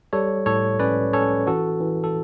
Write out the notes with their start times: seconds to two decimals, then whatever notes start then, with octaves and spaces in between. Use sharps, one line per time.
0.13 G3 A4 C#5
0.46 A2 A4 C#5
0.79 C#4 B4 D5
1.13 C#4 A4 C#5
1.47 E3 F#4 A4
1.81 E3
2.04 A4